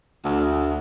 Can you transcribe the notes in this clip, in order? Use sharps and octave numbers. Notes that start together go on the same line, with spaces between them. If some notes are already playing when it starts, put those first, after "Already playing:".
D2